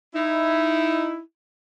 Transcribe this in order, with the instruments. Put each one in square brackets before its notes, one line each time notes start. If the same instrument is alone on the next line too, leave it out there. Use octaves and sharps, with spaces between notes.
[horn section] D#4 E4